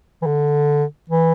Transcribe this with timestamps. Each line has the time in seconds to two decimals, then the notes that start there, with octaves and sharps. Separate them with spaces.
0.22 E3
0.26 D3
1.10 E3